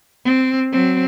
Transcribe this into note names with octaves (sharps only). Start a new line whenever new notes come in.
C4
F#3 C4